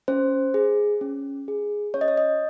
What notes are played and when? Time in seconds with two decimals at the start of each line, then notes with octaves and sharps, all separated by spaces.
0.08 C#4 C5
0.54 G#4
1.01 C#4
1.48 G#4
1.94 C#4 C#5
2.01 D#5
2.08 C#5
2.17 D#5